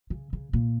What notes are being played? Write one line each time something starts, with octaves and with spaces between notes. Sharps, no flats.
C#3
C#3
A#2